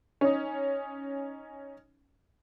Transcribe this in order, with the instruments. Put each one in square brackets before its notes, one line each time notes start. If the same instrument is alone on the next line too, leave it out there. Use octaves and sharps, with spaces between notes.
[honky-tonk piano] C#4 D#4